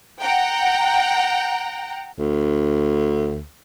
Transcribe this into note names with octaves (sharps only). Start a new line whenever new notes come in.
F#5 G5 A#5
D2